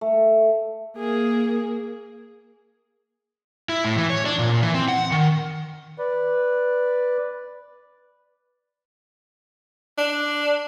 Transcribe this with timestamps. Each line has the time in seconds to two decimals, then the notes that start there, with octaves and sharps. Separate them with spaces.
0.01 A3
0.96 A#3 G#4
3.69 E4
3.84 A2
3.98 E3
4.10 C#5
4.26 D4
4.39 A#2
4.62 E3
4.74 C4
4.88 F#5
5.12 D#3
5.98 B4 D5
9.98 D4